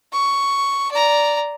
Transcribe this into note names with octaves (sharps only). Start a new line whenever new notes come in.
C#6
D5 A#5